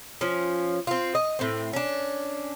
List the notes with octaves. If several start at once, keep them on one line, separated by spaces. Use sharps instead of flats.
F3 C#4
C4 F4
D#5
A2 C4
C#4 D4